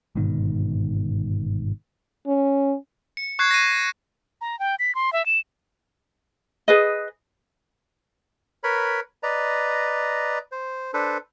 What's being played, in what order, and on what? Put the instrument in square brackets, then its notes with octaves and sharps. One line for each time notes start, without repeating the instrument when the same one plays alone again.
[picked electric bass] G1 G#2 B2 D#3
[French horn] C#4
[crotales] C#7
C#6 F#6 G#6 C7
A#6 C7 D#7
[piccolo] A#5
G5
B6
C6
E5
E7
[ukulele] G#4 B4 D#5
[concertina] A#4 B4 C#5 B5
B4 D5 D#5 A#5
C5
D4 A4 B4 C5